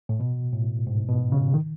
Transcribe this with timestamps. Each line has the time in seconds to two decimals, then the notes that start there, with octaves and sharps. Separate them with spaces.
0.09 A2
0.20 B2
0.53 A2
0.87 G#2
1.09 B2
1.32 C#3
1.54 D#3